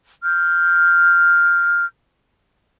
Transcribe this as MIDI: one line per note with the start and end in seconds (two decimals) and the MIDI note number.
0.23 1.85 89
0.23 1.85 91